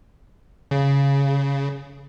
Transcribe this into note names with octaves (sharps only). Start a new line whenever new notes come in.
C#3